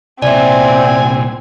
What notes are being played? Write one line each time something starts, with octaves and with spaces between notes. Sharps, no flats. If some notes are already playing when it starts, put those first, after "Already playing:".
C2 A#2 C4 D5 E5 G#5